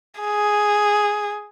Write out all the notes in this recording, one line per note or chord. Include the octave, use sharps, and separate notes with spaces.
G#4